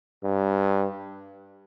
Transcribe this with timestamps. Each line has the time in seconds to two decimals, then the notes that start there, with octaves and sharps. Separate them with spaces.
0.24 G2